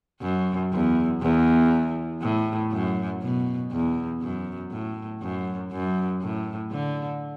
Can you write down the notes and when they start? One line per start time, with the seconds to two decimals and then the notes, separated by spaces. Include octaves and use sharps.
0.22 F#2
0.72 E2
1.22 E2
2.22 A2
2.72 F#2
3.22 B2
3.71 E2
4.21 F#2
4.71 A2
5.22 F#2
5.71 F#2
6.21 A2
6.71 D3